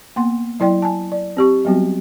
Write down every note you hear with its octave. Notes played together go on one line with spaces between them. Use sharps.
A#3 B3 F#5 C6
F#3 E4 D5 G5 C6
G#5 A5
D5
C4 G4 C#6
F#3 G3 B3 C4 F#4